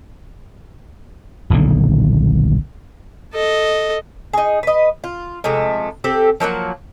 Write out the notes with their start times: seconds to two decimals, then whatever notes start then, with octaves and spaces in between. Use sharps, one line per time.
1.50 D#1 B1 A#2 D3
3.33 A4 D#5
4.33 D#4 G#4
4.63 B4 D#5
5.04 F4
5.44 C3 F3 G#3 A3
6.04 C4 G4 A4
6.40 F3 F#3 A#3 F#5